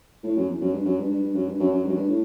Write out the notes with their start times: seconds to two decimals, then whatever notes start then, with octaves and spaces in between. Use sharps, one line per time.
0.23 A2
0.36 F#2
0.49 E2
0.61 F#2
0.72 G2
0.85 F#2
0.98 G2
1.10 G2
1.22 G2
1.34 F#2
1.47 G2
1.59 F#2
1.71 F#2
1.83 G2
1.89 F#2
1.95 G2
2.08 A2